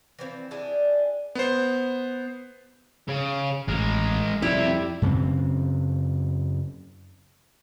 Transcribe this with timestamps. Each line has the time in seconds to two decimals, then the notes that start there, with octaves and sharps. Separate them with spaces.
0.19 E3 F3 C4
0.51 D4 E4 G4 G#4
1.35 B3 C5
3.08 C#3
3.68 A1 G#3 A#4
4.42 F2 G3 E4 G4 E5
5.02 F#2 C#3 C4